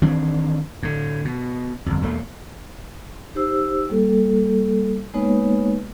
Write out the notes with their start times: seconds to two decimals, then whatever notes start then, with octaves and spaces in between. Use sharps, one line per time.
0.02 D#3 E3 C4 D4
0.83 A2 D3
1.25 B2
1.86 G1 F2
2.01 E1 E2 A3 A#3
3.35 D#4 G4 C5 E6
3.90 G3 A#3 A4
5.14 G#3 A#3 B3 D#4 B4 C#5